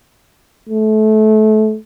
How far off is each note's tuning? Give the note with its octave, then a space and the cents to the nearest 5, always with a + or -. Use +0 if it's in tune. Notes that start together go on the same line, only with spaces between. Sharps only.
A3 -25